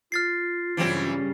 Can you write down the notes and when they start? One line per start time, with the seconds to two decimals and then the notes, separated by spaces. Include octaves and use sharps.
0.12 F4 F6 A6 C7
0.77 G2 C#3 E3 F#3 G3 C4